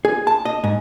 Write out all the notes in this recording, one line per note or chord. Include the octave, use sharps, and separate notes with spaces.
G#4
A5
D#5
G#2